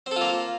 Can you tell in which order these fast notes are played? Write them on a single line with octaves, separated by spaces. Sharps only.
C4 A4 F4 A#3